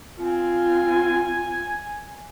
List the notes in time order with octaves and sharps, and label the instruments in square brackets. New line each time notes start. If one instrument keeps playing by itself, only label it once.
[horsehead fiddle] C4 F4 [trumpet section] G#5